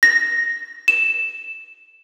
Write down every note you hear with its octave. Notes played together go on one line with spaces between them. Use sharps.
A#6
E7